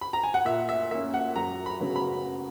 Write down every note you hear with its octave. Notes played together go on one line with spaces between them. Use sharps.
B5
A#5
G#5
F#5
A#2 E5
E5
A#3 C#4 E5
F#5
F#2 A#5
B5
C#3 F#3 B3
B5